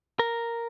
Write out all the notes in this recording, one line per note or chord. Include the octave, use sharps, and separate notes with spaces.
A#4